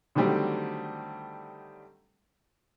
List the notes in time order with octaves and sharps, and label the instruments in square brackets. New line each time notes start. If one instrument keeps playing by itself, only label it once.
[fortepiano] D3 D#3 F#3 G3 A3 C4